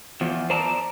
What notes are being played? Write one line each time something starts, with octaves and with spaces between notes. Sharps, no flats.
E2 F3
C5 D5 A5 A#5